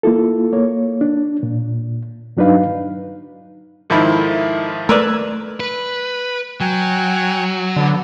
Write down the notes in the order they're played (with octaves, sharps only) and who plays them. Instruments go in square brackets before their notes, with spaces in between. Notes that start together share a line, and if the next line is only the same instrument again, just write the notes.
[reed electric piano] A#3 E4 F4 A4
A#3 C#5
D4
A#2
G2 F#3 D4 D#4 B4 F5
[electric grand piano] G#2 D#3 F3 [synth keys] D#4 E4 A4
[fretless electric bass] A3 [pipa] A#4 B4 D5 [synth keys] E6 F#6 G#6
[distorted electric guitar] B4
[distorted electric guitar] F#3 [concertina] G5 G#5 F#6
[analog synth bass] D3 [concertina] B3 A4